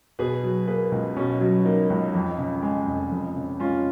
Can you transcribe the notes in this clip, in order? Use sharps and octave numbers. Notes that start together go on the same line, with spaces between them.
B2 G#4 B4
F#3
A#3 G#4 B4
C#2
B2 C#4
F#3
A#3 D#4
C#2
F2
C#3
G#3
F1
F2
C#3
G#3 C#4 F4